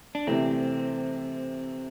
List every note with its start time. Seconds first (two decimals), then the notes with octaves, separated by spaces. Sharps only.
0.15 D4
0.27 C3 E3 A3 C4